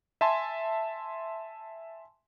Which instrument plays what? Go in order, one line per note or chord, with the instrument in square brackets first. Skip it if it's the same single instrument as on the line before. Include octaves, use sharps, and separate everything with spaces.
[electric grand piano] E5 G#5 A5 C6